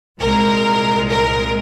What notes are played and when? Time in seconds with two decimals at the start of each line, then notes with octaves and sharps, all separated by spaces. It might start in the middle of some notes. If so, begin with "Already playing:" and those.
0.19 C2 A#2 G#3 A#4
1.09 A#4